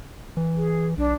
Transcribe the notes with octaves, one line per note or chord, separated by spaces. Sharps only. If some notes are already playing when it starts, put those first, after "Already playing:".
E3
G#4
B1 D4